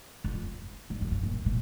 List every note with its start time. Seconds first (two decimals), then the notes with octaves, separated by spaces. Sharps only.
0.24 F2
0.90 G2
1.01 F2
1.11 G2
1.23 A#2
1.46 A#2